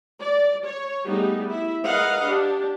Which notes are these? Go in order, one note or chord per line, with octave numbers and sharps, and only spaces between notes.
D5
C#5
G3 A3 B3 D#4 G4 G#4
E4 E5
G#4 A#4 B4 D#5 F5 F#5
D4 G4